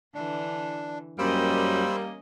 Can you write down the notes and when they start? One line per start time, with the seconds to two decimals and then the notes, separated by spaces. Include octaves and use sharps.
0.14 D3 E3 D4
1.19 F#2 G3 A#3 C#4 C5 D#5 B5 E6